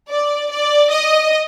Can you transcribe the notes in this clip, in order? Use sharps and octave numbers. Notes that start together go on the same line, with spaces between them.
D5
D5
D#5